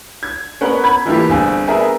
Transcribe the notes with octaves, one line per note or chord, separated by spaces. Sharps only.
G#6
B3 C#4 A#4 B4 F#5
B5 G#6
E3 A3 A#3 E4 F4 G4
G1 C4 G#4 G#5
B3 G#4 A#4 E5 G#5 A#5